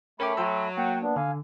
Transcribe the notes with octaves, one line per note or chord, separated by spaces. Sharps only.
A3 C#4 A#4 G5 B5 D6
F#3 G5 C6 E6
A#3 F#5 G5
B3 D4
D3 F5 G#5